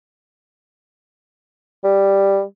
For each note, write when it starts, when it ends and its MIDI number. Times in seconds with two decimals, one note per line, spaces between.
1.84 2.42 55